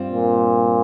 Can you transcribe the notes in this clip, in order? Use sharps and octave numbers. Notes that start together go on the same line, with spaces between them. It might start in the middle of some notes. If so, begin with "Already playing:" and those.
Already playing: G2 G3 C4 F4
A#2